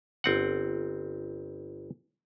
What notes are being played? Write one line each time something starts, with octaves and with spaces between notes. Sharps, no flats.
G1 C4 F#5